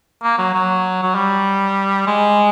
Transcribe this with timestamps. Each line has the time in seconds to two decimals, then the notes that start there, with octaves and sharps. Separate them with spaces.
0.23 A#3
0.38 F#3
0.54 F#3
1.03 F#3
1.15 G3
2.07 G#3